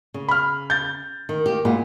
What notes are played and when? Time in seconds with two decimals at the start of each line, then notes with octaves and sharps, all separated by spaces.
0.14 C#3
0.29 B5 F6
0.70 G6 A6
1.29 D#3
1.46 A#3 G4
1.65 A#2 G#3 B3